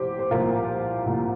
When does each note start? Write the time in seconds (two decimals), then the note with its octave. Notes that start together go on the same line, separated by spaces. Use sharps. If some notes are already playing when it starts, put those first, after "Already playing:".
Already playing: C2 A#2 F3 G4 C5
0.19 C5
0.31 C2 A#2 F3 F4 A#4
1.06 C2 A#2 F3